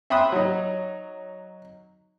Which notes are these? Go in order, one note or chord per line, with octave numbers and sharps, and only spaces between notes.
E5 G5 B5 C6 D#6 F#6
F#3 D#4